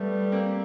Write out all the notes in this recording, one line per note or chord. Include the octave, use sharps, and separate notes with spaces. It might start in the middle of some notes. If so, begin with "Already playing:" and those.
Already playing: G3 A3 B3
A#3 C4